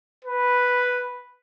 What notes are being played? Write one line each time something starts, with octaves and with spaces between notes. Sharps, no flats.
B4